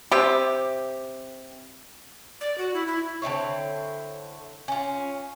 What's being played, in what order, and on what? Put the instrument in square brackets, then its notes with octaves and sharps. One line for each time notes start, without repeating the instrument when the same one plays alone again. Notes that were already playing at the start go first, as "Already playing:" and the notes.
[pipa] C3 G4
[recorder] D5
F#4
E4
E4
[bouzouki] D3 C4 E4 C#5
C#4 F4